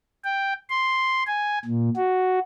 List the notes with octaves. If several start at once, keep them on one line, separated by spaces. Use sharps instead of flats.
G5
C6
G#5
A#2
F#4